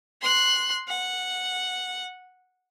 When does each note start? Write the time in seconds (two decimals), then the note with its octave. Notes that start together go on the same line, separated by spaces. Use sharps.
0.22 C6 F#6
0.88 F#5